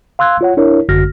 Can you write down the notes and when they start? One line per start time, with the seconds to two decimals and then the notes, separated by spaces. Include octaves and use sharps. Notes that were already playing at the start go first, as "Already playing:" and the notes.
0.19 F5 C6 E6 F#6 G#6
0.41 F4 C#5 F#5
0.57 D4 E4 A#4 C#5
0.89 G#1 F#2 D3 F#4 F6 A#6